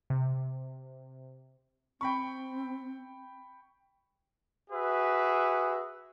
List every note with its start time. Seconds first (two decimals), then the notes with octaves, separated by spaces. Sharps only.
0.10 C3
2.01 C4 G5 B5 C#6
4.70 F#4 G#4 B4 E5